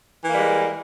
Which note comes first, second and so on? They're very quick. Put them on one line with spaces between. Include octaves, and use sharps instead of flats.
E3 A#3 G3 G#3